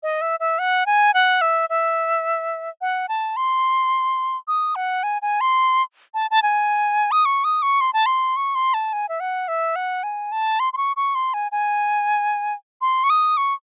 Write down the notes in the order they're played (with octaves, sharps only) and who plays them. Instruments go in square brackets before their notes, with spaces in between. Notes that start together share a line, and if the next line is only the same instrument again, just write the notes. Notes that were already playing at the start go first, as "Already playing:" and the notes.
[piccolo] D#5
E5
E5
F#5
G#5
F#5
E5
E5
F#5
A5
C6
D#6
F#5
G#5
G#5
C6
A5
A5
G#5
D#6
C#6
D#6
C#6
C6
A5
C6
C#6
C6
A5
G#5
E5
F#5
E5
F#5
G#5
A5
C6
C6
C#6
C#6
C6
G#5
G#5
C6
C#6
D#6
C#6